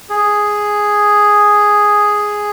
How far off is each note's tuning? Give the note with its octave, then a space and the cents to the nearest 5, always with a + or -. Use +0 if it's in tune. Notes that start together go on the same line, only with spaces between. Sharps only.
G#4 +0